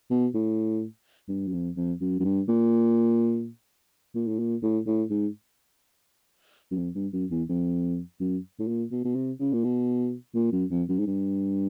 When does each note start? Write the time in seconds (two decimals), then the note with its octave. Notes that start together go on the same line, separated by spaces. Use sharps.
0.10 B2
0.34 A2
1.28 G2
1.48 F#2
1.53 F2
1.76 F2
2.00 F#2
2.20 F#2
2.24 G2
2.48 A#2
4.15 A#2
4.28 A2
4.39 A#2
4.62 A2
4.87 A2
5.10 G#2
6.71 F#2
6.77 F2
6.95 G2
7.13 F#2
7.31 E2
7.49 F2
8.20 F#2
8.59 A2
8.68 A#2
8.92 B2
9.04 B2
9.15 C3
9.40 C#3
9.53 A#2
9.64 B2
10.35 A#2
10.52 F#2
10.71 F2
10.89 F#2
10.99 G#2
11.07 G2